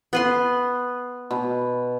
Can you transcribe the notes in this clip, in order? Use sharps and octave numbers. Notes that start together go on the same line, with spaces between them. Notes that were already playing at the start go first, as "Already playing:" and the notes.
B3 B4 C6
B2